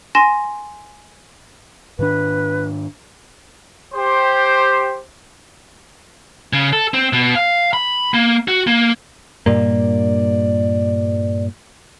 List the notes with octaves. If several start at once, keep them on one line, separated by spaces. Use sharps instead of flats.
G#5 C6 A#6 E7
G#2 D#3 D4 B4
G4 C5
C#3
A4
C4
B2
F5
B5
A#3
F#4
A#3
G2 A#2 A#3 D5